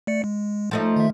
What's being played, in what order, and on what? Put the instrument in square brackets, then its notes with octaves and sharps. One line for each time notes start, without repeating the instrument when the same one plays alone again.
[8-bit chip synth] A3 D5 C#7
G#3
[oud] F3 A3 D#4
[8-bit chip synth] D#3 E5